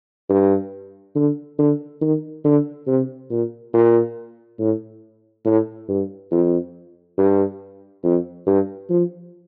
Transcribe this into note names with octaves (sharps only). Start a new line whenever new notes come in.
G2
D3
D3
D#3
D3
C3
A#2
A#2
A2
A2
G2
F2
G2
F2
G2
F3